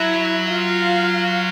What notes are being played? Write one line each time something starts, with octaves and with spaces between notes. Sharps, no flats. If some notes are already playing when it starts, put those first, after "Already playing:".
Already playing: F#3 E4 E5
F4 F5